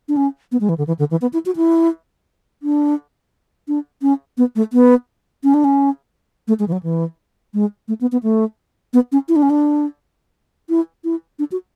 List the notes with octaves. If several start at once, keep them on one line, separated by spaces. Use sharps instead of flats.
D4
C#4
B3
G#3
E3
D3
E3
D3
E3
B3
E4
F#4
E4
D4
D4
C#4
B3
A3
B3
C#4
D4
C#4
A3
G#3
E3
F#3
E3
G#3
A3
B3
B3
A3
B3
C#4
E4
D4
C#4
D4
E4
E4
D4
F#4